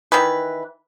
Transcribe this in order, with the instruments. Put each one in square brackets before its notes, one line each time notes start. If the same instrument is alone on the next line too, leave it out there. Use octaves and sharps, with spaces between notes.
[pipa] D#3 E3 B4